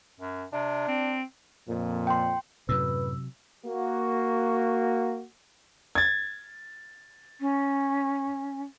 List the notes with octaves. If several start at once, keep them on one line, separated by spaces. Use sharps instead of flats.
F#2
C3 D4
C4
F2 A#2
G5 C6
F#2 A2 C3 F#3 B4 E6
A#3 F#4
G#6 A6
C#4